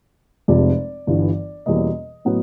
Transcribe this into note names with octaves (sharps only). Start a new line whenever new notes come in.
F1 F2 C3 F3 G#3 D5
G1 G2 E3
E2 B2 G3 A#3 C#4 D#5
A2 F#3 B3